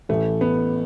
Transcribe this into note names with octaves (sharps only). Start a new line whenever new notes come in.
A1 A2 E3 A3
B3